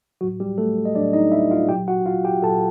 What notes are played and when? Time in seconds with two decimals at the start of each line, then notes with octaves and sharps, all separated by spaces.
0.21 A2 F#3 F#4
0.40 G3 G4
0.58 A3 A4
0.85 D#5
0.95 A2 F#3 D4 D5
1.13 D#4 D#5
1.32 E4 E5
1.51 F4 F5
1.69 A#2 F#3 G4 G5
1.88 F#4 F#5
2.06 F4 F5
2.25 G4 G5
2.43 A#2 F#3 A4 A5